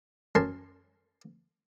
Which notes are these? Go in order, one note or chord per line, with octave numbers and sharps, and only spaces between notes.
F#2 A#4 G#5 A5 C6